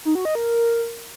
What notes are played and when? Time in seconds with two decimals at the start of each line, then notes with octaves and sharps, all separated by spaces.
0.05 D#4
0.15 F#4
0.25 D#5
0.35 A#4